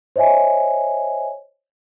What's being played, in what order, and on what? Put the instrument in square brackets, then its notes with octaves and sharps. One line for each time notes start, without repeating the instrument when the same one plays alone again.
[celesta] C5 C#5 D#5 E5 G#5